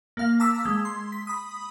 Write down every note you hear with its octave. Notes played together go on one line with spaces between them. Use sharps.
A#3 F5
A5 A#5 D6 E6 B6
G#3
C6
B6
B5 D#6